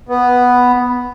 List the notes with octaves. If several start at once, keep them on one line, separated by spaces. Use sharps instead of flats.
B3